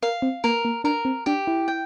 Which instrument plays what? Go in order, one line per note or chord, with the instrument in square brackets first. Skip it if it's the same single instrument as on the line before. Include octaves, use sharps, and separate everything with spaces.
[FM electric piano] A#4 [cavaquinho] F5
[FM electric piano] C4
[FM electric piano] A#3 [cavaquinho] A#4
[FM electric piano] A#3
[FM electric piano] D4 [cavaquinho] A#4
[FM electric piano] C4
[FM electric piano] D4 [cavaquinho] G4
[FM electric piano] E4
[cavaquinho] G5